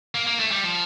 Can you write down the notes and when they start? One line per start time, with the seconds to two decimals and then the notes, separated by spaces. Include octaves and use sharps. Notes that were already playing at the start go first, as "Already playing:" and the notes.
0.15 A#3
0.27 A#3
0.39 A3
0.51 G3
0.63 F3